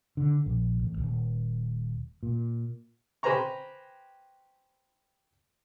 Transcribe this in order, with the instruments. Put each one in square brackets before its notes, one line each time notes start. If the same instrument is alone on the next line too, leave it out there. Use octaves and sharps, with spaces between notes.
[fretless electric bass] D3
A#1
A1
D#1
A#2
[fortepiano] G4 B4 C5 G#5 A#5 C#6